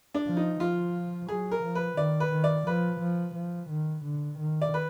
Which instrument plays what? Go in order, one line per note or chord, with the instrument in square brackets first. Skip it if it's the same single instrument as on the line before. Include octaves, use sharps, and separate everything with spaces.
[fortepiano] D4
[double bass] F3
[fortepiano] D#4
[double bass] F3 [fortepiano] F4
[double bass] F#3 [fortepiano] G#4
[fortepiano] A#4
[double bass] F3
[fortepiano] B4
[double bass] D#3 [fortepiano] D5
[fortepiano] B4
[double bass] D#3
[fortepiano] D5
[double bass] F3 [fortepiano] B4
[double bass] F3
F3
D#3
D3
D#3
[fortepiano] D5
B4